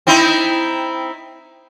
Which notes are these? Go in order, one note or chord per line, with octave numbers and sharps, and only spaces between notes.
C4 D#4 E4